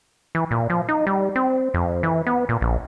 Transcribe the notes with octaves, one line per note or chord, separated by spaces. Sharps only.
E3
A#2
F3
D#4
G3
C4
F2
E3
B3
A#2
A#1